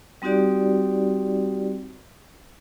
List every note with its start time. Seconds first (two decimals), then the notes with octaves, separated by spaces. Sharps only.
0.22 G3 C4 D#4 F#4 G4 D5